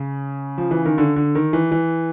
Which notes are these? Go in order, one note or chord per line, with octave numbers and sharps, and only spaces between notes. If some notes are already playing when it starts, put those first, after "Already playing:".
Already playing: C#3
F3
E3
D#3
D3
D3
D#3
E3
E3